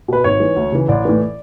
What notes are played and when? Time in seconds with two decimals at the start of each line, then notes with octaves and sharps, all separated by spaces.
0.08 B2 B4
0.24 G#1 C#5
0.40 G#2 E3
0.56 D2
0.72 C#3 E3
0.88 A1 D5
1.05 A2 E3